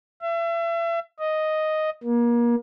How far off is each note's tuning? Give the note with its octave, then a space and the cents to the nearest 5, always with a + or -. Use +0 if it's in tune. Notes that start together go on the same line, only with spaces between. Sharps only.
E5 +35
D#5 +0
A#3 +30